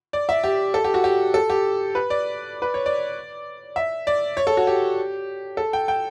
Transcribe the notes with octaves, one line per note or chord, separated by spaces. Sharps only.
D5
E5
G4
A4
G4
F#4
G4
A4
G4
B4
D5
B4
C#5
D5
E5
D5
C#5
A4
F#4
G4
A4
G5
G5